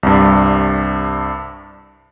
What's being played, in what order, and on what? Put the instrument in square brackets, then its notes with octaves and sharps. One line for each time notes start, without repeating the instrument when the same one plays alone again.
[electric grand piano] C2 G2